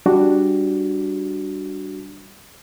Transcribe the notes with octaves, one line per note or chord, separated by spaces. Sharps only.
G3 D4 F#4